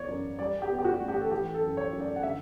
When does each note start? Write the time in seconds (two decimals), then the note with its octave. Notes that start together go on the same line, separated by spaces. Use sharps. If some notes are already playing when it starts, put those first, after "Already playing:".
Already playing: E3 B3 C#5 D5
0.08 F#2
0.39 G3 D5
0.62 G4
0.70 B3
0.79 G4
0.85 F#4
1.00 A1
1.08 G4
1.21 A4
1.31 E3 G4
1.54 A4
1.62 F#2
1.77 C#5
1.93 F#2
2.00 D5
2.16 F#5
2.23 D3 E5